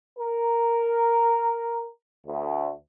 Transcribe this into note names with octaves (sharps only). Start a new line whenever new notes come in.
A#4
D2